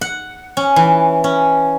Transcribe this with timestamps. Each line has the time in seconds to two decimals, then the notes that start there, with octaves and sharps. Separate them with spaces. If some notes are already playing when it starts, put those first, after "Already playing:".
0.01 F#5
0.57 C#4
0.76 E3
1.24 C#4